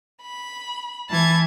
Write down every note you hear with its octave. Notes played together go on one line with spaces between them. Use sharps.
B5
E3 A5 G#6